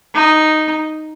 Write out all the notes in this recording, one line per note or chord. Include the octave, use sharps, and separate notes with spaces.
D#4